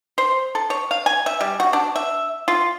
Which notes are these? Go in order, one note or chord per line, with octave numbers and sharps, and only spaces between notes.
C5
A4
C#5
F5
G#5
E5
G3
F#4
D4
E5
F4